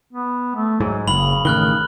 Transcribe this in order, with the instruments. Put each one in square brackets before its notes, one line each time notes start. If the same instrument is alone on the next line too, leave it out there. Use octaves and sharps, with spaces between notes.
[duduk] B3
A3
[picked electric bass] G#2 [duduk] F#3
[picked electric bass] F#1 [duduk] C#3 [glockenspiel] B5 F#7
[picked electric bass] A1 D#3 [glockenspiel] F6 F#6 G7